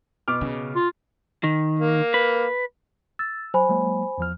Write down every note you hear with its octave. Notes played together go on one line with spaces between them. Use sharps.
B2 D6 F6
C#3
F4
D#3
A#3
B4
E6 A6
F#3 C5 G#5 B5
F#3 G#3 A#3
E2 F3 F6